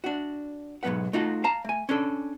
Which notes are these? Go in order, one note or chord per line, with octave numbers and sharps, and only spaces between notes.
D4 F#4
B1 G#2 F#3 B3 B4 F#5
A3 D#4 F4 F#4
F5 A5 A#5
A3 G#5
C#4 D4 A4